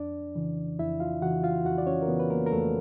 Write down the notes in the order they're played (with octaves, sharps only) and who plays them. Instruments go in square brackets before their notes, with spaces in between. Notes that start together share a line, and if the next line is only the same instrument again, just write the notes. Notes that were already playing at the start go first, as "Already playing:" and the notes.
Already playing: [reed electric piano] F2 D4 D5
C#3 E3
F2 E4 E5
F4 F5
C#3 E3 F#4 F#5
F4 F5
F2 F#4 F#5
D5
C#4 C#5
A#4
C#3 E3 B3 B4
B4
A#3 A#4
A#4
F2 A3 A4